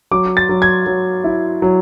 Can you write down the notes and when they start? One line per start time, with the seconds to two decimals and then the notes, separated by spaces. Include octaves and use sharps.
0.11 F#3 D6
0.37 A6
0.49 F#3
0.62 G#6
0.86 F#3
1.24 E4
1.62 F#3